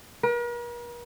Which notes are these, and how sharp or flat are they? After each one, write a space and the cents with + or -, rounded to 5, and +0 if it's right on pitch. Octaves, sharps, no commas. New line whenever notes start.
A#4 +45